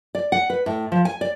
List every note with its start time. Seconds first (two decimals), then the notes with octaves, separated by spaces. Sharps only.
0.15 D5
0.32 F#5
0.50 B4
0.66 A2
0.92 F3
1.05 G#5
1.21 D5